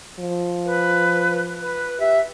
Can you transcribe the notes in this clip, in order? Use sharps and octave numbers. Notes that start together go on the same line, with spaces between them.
F3
B4
B4
G4 E5